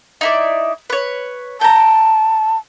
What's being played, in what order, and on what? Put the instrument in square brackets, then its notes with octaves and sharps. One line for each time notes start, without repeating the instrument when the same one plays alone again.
[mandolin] D#4 E4 D5
B4 C#5
[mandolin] G5 A#5 [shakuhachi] A5